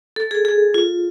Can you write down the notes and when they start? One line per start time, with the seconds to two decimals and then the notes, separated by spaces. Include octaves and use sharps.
0.16 A4
0.31 G#4
0.45 G#4
0.74 F4